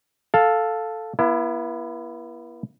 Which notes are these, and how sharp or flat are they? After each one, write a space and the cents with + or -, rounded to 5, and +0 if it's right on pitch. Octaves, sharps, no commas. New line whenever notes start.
A4 +0 F5 +10
B3 -40 E4 +20